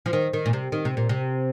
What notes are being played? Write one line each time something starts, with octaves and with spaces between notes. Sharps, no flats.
F3
D#3
D#3
A#2
C3
D#3
C3
A#2
C3